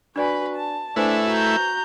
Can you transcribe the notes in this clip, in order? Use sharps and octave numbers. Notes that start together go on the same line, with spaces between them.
D4 F#4 B4 D5 G#5 B5
A5
A3 D4 E4 B4 C5 G#5
F#4 A#5 G6